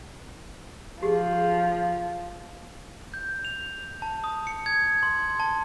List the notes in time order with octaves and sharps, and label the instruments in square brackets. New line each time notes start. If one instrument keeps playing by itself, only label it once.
[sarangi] F3 [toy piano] G4 G#4
[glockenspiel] G6
F7
A5
D#6
C#7
G#6
C6
A5